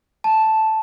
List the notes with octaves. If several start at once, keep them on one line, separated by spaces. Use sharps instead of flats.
A5